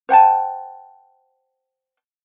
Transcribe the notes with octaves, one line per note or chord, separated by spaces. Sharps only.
C5 F#5 G5 A5